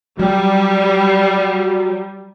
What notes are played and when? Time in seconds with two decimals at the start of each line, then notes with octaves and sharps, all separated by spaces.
0.19 F#3 G3